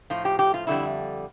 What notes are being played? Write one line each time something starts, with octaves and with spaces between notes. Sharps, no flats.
A2 F3 F4
G4
G4
F4
F2 D3 G3 E4